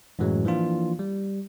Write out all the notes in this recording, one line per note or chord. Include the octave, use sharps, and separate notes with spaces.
F#2 A2 E3 F#3 G#3
E3 F3 A#3 D4 F4
G3